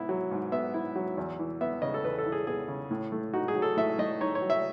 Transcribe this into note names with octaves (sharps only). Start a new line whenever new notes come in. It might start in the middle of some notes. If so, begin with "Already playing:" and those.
Already playing: G#2 B3 E4
F#3
G#2
B3 E5
E4
F#3
E2
E3
B3 E5
C#3 D#5
A4
E2 B4
A4
E3
G#4
B3 G#4
C#3
A2
A3
D#4 F#4
G#4
F#3
A4
A2 E5
A3 D#5
D#4 C#5
C#5
F#3
E5